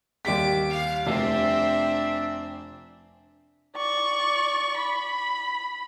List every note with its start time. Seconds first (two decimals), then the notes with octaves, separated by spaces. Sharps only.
0.25 D#2 G3 D6 B6
0.70 F5
1.06 F1 C4 D4 E5
3.76 D5 C#6
4.78 B5